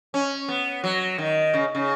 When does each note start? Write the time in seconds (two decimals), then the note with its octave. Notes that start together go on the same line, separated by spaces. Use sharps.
0.14 C#4
0.49 B3
0.84 F#3
1.18 D#3
1.54 C#3
1.75 C#3